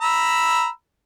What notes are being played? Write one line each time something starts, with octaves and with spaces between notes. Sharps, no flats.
A#5 B5 E6